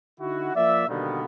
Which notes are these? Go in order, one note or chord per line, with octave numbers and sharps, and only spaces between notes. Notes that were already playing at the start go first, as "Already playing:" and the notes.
D3 D#4 E4 F#4
F3 A#3 D5 E5
B2 D3 D#3 G3 A#3 B3